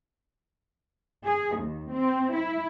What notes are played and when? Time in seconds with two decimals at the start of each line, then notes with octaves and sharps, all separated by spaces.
1.25 G#4
1.57 D#2
1.91 C4
2.33 E4